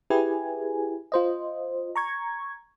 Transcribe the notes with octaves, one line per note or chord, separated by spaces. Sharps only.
E4 G4 G#4 B4 G#5
F4 C5 D#5
A#5 C#6 G#6